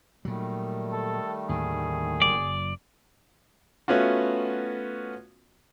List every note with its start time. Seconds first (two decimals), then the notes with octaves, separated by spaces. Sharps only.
0.25 A#2 D#3 F#3 G3 A3
0.93 A4
1.49 D#2 A2 D3 G#4
2.22 F#1 F#3 D5
3.88 A3 B3 C#4 F4 F#4